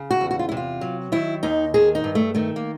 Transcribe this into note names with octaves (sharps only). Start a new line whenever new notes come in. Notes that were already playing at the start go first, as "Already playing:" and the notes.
Already playing: C#3
F#4
E2
F#4
F4
E4
C3
F4
F#3
D#3 E4
D#2 D#4
D#3 G#4
D#4
G2
A3
D#3 A3
A#3